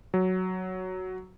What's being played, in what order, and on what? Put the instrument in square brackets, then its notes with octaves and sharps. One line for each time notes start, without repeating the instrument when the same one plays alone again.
[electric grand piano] F#3